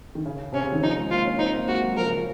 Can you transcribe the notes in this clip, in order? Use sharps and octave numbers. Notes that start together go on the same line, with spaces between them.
D#3
C#3
C3 C#4
C#3
D#3
F3 D#4
G#3
A#3 F4
C#4
C4 D#4
A#3
G#3 F#4
F#3
F3 A#4
C#3
F3